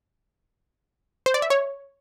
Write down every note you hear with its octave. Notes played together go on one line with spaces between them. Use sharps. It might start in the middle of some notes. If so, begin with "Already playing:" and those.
C5
D5
E5
C#5